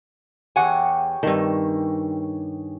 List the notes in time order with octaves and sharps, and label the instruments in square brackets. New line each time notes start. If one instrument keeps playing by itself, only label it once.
[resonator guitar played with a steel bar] E2 F#5 G#5 [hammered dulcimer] G4 G#4 C#5
[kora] G2 D#3 [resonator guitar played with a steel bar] C4 A5